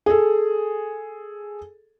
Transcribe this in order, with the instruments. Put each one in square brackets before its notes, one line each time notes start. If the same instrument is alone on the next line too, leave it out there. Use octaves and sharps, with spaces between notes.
[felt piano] G#4 A4